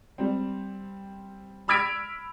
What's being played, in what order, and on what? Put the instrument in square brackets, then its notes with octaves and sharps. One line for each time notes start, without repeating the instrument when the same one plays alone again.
[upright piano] G3 C4
B5 E6 F6 G#6 B6 D7